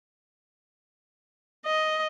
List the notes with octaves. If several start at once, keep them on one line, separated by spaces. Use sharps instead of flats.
D#5